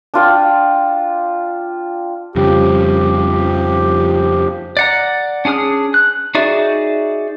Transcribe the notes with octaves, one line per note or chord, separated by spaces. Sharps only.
D4 F4 G5
F2 C#3 F3 G3 G4
D5 F#5 A#5
C#4 D4 G#4 D#6 F6
F#6
D#4 F#4 G#4 D5 E5